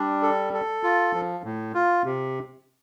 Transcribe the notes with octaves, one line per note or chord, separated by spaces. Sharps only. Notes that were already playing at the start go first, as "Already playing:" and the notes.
Already playing: G3 D4
A4
A4
F4
F3
A2
F4
C3